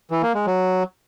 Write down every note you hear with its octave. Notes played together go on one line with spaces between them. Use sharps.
E3
A#3
G#3
F#3